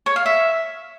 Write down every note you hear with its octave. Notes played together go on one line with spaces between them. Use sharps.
C#5
F5
E5